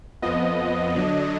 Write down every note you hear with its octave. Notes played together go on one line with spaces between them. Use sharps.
F2 F3 B3 D#5
D3 F#3 D4